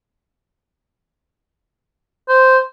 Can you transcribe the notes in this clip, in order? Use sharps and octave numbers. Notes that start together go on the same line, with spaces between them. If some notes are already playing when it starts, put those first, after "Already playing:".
C5